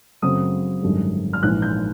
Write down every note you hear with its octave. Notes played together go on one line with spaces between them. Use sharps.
F#2 C#3 F#3 A3 C4 D#6
G#1 F#2 D3 G3
F6
A#1 G#2 E3 F#6
G6